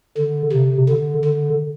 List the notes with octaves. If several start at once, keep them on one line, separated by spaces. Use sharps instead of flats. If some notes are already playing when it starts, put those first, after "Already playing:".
D3
C3
D3
D3